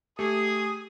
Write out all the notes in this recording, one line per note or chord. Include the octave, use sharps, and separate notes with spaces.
A3 G4 G#4 D#6